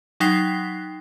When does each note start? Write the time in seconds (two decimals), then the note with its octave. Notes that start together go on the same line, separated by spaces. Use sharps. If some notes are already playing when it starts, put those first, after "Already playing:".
0.20 F#3 D#4 G5 F#6 B6 C7